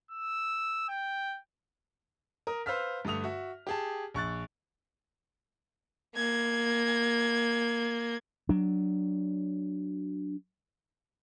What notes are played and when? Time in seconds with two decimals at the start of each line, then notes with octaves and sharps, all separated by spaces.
0.11 E6
0.89 G5
2.47 A#4 D#6
2.66 B4 C5 F5 E6 F6 B6
3.05 G2 D3 A3 D#6 F7
3.24 F#4 E5
3.67 G4 G#4 A5
4.14 A#1 C#6 F#6 A6
6.16 A#3 G#6
8.49 F#3 D4